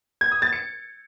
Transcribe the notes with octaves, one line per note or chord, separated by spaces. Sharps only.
G#6
D#6
A6
C#7